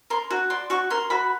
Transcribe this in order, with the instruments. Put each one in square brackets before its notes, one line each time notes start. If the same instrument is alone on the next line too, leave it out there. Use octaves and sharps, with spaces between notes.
[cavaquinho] A#4 C6
F#4
D5 C6
F#4 C#6
A#4 C6
F#4 B5